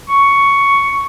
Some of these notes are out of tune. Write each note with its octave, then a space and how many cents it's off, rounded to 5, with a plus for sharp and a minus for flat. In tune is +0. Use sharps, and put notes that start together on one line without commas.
C#6 +5